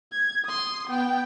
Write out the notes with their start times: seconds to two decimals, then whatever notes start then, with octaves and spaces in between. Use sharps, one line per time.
0.12 G#6
0.44 C6 D#6
0.88 B3 G5